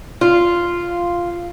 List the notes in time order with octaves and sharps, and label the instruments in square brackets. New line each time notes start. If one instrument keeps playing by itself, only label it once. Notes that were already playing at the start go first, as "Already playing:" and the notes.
[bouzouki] F4